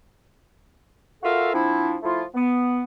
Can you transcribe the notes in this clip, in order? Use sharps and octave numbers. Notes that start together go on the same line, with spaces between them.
F4 F#4 A4 A#4 E5 F5
F3 C4 D4 E4
F3 A3 E4 F4
B3